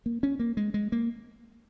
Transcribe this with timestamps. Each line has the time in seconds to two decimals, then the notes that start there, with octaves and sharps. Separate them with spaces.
0.06 A#3
0.23 C#4
0.40 A#3
0.57 G#3
0.74 G#3
0.92 A#3